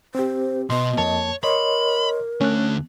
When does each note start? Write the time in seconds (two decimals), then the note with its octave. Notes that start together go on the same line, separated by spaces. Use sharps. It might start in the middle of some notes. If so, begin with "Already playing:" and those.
0.15 C4 G4 C5
0.70 B2 B3 D#5 C6
0.98 F2 A#3 C#5 A5
1.43 A#4 C#5 D#5 B5 C6
2.41 D2 A3 C#4 F#6